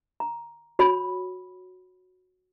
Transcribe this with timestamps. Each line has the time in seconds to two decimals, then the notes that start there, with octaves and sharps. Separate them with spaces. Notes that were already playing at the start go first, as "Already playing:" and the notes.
0.20 A#5
0.79 F#4 C#5 B5